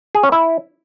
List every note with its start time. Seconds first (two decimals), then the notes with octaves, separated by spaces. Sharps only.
0.15 G#4
0.23 C#4
0.32 E4